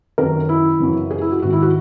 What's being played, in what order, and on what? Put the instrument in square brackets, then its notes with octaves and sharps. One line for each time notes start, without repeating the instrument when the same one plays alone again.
[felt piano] F#2 D#3 A#4
E4
F#2 C#3 E3
G#4
E4
F#4
G#2 D#3 F#4
E4
F#4